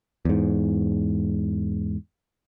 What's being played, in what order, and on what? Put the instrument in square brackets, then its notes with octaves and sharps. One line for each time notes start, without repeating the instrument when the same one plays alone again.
[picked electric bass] E2 G#2